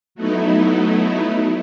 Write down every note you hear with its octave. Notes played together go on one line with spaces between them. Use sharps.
F#3 A3 B3 D#4 E4